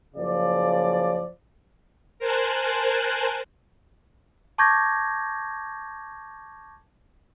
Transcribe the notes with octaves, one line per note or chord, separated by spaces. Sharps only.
F#1 C#3 F3 D5
A#4 C5 G#5 A5 F#6
A5 C#6 D6 G6 G#6 A#6